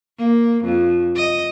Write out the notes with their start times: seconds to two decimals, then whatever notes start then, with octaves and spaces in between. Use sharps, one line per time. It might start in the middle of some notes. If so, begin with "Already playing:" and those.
0.18 A#3
0.64 F2
1.16 D#5